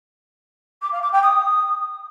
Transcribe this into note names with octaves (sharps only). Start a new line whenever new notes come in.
D6
F5
D6
G5
D#6